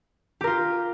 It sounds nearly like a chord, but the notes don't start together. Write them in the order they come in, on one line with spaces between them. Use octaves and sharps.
G4 A#4 F4